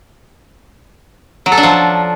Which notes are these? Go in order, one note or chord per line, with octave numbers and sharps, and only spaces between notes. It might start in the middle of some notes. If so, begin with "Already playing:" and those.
F#3
A4
D4
F3